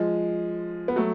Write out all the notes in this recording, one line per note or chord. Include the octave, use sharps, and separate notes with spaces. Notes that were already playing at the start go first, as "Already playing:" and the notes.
Already playing: F3 G#3
B3
F#3 A3